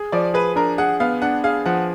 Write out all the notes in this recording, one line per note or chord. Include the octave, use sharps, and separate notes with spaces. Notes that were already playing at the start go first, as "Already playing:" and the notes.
Already playing: G#4
F3 D5
G#4 B4
D4 A#4
G#4 F#5
B3 F5
D4 F#5
G#4 F5
F3 F#5